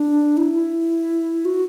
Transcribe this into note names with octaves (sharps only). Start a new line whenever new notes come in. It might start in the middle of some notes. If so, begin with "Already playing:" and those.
Already playing: D4
E4
F#4